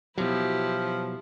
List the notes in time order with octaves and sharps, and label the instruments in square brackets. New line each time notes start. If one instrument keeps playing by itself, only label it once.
[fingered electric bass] B2 F#3 [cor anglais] F3 [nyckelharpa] E4 G4